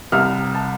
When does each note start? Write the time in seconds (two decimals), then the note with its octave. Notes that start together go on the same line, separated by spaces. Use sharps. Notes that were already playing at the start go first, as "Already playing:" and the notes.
0.12 C2 C3 G3 F6
0.55 A5